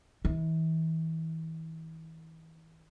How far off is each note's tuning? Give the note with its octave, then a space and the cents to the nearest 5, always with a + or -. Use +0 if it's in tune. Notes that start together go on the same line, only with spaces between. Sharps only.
E3 -35